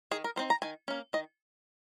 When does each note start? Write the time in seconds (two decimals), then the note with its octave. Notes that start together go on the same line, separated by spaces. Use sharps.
0.11 D#3 G#4
0.24 A#4
0.36 G3 C4 D#4 C5
0.50 A#5
0.62 D#3 G#5
0.88 A#3 C#4
1.13 D#3 D#5